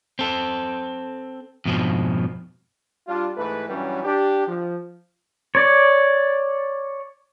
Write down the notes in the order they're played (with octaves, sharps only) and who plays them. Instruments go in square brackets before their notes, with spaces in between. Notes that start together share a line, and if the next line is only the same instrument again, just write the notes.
[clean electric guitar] C4 A4
F2 G#2 B2 F3
[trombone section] G3 D4 F4
G#2 E3 A3 B4
G2 E3 F#3 G3 C#4
D4 G4
F3
[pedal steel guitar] C#5 D5